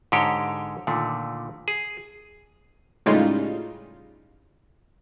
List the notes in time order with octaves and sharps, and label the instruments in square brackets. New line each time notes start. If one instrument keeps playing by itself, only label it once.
[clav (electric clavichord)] G#2 D3 G#3 G4 C#5 G5
A#2 D3 D#3 A3
G#4
[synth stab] A2 C#3 G3 G#3 D#4 F4